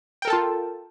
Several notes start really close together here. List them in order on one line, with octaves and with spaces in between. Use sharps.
G5 A#4 A4 A5 F4